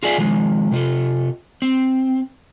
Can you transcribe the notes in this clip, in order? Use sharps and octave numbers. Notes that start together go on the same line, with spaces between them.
F4 F#4 G#4 D5 E5 F5
D#3 F3 G#3
C3 F4 A4
C4